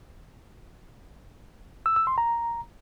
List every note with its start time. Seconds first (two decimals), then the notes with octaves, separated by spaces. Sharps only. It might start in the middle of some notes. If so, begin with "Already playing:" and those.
1.86 E6
1.96 E6
2.07 C6
2.18 A#5